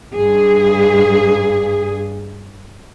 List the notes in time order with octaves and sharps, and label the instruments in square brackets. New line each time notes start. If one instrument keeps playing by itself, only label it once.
[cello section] G2 G#4